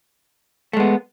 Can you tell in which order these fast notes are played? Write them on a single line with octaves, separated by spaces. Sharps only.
A3 G#3 B3